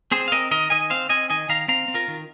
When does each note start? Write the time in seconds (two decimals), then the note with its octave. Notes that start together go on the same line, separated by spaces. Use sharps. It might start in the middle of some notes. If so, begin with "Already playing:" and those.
0.11 C4 G#4 C5
0.28 F5
0.32 C4 A#4 D#5
0.51 D#3 A#4 D#5
0.70 D#3 D#5 G#5
0.90 C4 C5 F5
1.09 C4 D#5 G#5
1.30 D#3 D#5 G#5
1.49 D#3 F5 A#5
1.68 C4 F5 A#5
1.88 C4
1.94 F4 A#4
2.08 D#3